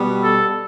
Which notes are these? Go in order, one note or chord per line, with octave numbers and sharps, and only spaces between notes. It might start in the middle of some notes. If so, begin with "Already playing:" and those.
Already playing: B2 G3 B3
A4